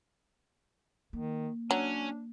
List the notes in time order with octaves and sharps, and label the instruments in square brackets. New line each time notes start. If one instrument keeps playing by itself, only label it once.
[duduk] D#3 [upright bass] A#3
[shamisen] F#3 [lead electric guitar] C#4 [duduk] D4